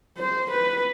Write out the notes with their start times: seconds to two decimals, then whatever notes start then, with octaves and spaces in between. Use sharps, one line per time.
0.18 C5
0.51 B4